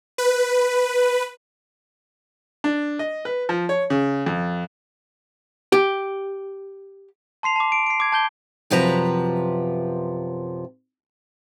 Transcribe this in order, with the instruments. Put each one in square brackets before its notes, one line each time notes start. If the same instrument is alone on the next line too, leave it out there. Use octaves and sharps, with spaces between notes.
[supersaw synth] B4
[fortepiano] D4
D#5
B4
F3
C#5
C#3
F2
[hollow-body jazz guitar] G4
[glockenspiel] A5 C6 C7 F7
A5 D6
D7
C7 D7
D6 G#6
A5 G6 G7
[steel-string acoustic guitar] F#2 C3 F3 B4 A#5